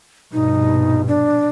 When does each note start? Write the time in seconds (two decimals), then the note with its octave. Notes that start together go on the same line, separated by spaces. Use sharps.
0.33 A#1 G2 B2 D#4
1.08 D4